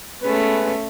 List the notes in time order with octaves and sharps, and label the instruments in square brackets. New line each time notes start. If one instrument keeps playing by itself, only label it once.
[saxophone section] G#3 B3 B4 [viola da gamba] A3 C#4